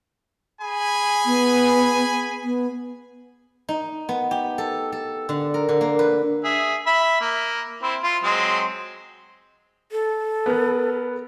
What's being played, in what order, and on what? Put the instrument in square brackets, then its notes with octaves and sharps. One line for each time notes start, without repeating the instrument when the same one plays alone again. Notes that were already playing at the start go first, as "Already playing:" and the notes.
[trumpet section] G#4 G#5 B5
[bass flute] B3
B3
[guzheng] D#4
B3
G4
A4
A4
D3
A#4
D3
A#3
B4
[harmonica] G#4 E5
E5 B5
A#3
C4 E4
F4
F#3 G#3 C4
[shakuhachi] A4
[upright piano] B3 A#4 B4